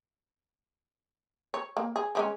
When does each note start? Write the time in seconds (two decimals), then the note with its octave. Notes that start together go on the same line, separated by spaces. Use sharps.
1.54 C#5
1.77 A#3
1.96 G#4
2.15 F3 G#3 C#4